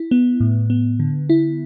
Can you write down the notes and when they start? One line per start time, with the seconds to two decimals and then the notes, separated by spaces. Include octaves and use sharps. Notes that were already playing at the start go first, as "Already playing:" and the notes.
Already playing: E4
0.11 B3
0.40 A2
0.70 B3
1.00 D3
1.30 E4